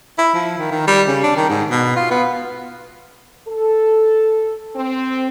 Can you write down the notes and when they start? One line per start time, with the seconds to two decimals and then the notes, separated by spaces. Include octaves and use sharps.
0.19 E4
0.35 F3
0.58 D#3
0.71 D#3
0.88 G3
1.08 C#3
1.24 D4
1.37 D#3
1.50 G#2
1.71 B2
1.96 F4
2.11 B3
3.47 A4
4.76 C4